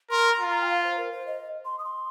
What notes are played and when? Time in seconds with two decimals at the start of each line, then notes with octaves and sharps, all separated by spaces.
0.11 A#4 C6
0.31 A#5
0.40 F4
0.49 A#5
0.61 G5
0.69 F5
0.84 C5
0.97 A#4
1.12 C5
1.27 D#5
1.65 C6
1.79 D#6
1.84 C6